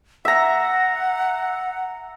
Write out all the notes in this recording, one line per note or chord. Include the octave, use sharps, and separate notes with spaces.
E5 F#5 A#5